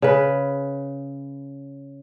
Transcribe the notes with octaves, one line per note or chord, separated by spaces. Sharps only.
C#3 B4